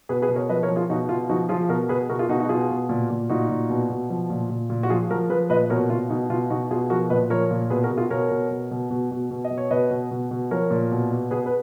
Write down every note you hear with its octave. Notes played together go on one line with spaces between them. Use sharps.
B2 G#4 B4
G#4 B4
B2
A#4 C#5
F3 B4 D#5
A#4 C#5
F3
F4 G#4
B2 D#4 F#4
B2 F4
F3 D#4 F#4
F3 F4 G#4
B2 F#4 A#4
B2 G#4 B4
B2 F#4 A#4
F4 G#4
B2 D#4 F#4
D#4 F#4
B2 F4 G#4
B2
A#2
A#2
A#2 D#4 F#4
A#2
B2
B2
F3
A#2
A#2
A#2
F#4
F3 F4 G#4
F3 F#4 A#4
F3 G#4 B4
A#2 B4 D#5
B2 A#4 C#5
B2 F4
B2 D#4
B2 F4
B2 D#4 F#4
B2 F4 G#4
F3 F#4 A#4
A#2 B4 D#5
F3 A#4 C#5
A#2
B2 G#4 B4
F#4 A#4
B2
F4 G#4
B2 A#4 C#5
B2
B2
B2
B2
B2
B2
D#5
B2
C#5
B2 B4 D#5
B2
B2
B2
F3 A#4 C#5
A#2
B2
B2
B2 G#4 B4
B4